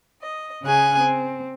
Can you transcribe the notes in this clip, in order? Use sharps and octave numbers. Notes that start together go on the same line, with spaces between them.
D#5
C#3 C#4 G#4 G#5 F#6
C4